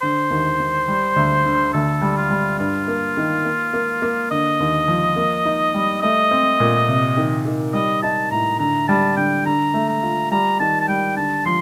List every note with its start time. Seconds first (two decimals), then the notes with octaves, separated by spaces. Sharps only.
0.02 D3 C5
0.31 D#2
0.60 D#2
0.88 G3
1.16 D2
1.45 D3
1.74 D2 A4
2.02 G3
2.17 F4
2.31 G3
2.59 G2 F4
2.88 A#3
3.17 D#3
3.45 A#3
3.73 A#3
4.02 A#3
4.31 D3 D#5
4.60 D#2
4.88 F3
5.16 A#3
5.45 D#4
5.74 G3
6.02 A3 D#5
6.31 C4
6.60 A#2
6.88 C3
7.17 D#3
7.45 D#3
7.73 G3 D#5
8.02 D#4 A5
8.31 A2 A#5
8.59 D3 A#5
8.88 G3 A5
9.17 D3 G5
9.45 D3 A#5
9.74 A3
9.89 A#5
10.03 F4
10.31 G3 A#5
10.60 D#3 A5
10.81 A5
10.89 G3 G5
11.16 D3 A5
11.46 F3 C6